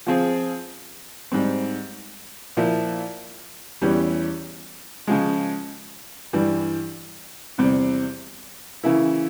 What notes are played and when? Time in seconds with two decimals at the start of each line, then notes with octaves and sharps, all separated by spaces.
0.07 F3 C4 F4 G#4
1.32 G#2 G3 C4
2.57 A#2 F3 A#3 E4
3.82 E2 E3 G3 C#4 G4
5.07 C#3 F3 G#3
6.33 G2 E3 G3
7.58 E2 C3 G3 C4
8.83 C#3 E3 A#3 E4